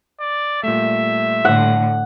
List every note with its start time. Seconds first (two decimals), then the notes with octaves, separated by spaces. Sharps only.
0.20 D5
0.63 A#2 G3 A3 E5
1.45 A2 D3 F#5